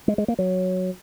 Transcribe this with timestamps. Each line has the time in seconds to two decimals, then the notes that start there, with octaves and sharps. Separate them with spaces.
0.08 G#3
0.18 G#3
0.28 A#3
0.39 F#3